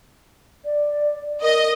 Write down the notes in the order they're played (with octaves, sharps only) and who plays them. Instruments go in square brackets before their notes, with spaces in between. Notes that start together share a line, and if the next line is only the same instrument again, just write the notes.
[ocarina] D5
[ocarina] A#4 [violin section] D#5